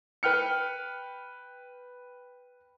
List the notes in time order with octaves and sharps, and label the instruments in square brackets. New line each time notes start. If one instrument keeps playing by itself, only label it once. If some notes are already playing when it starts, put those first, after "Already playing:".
[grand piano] B4 G5 F6 C#7